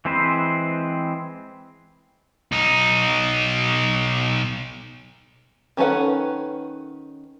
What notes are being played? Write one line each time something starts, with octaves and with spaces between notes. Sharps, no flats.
E3 G#3 C4 B4 C5
B1 D#4
D#3 C#4 A4 B4 F#5